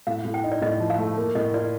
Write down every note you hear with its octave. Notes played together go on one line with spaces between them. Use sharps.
A2 F5
A2
G5
D#4
D5
A2 D#5
F3
F5
A3
A#3
A2 D#5
F4 D5